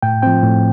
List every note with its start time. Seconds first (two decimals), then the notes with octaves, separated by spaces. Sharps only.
0.02 A2 G5
0.22 F3 C4 G5
0.43 A2